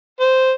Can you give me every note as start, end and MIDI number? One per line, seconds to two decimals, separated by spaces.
0.20 0.52 72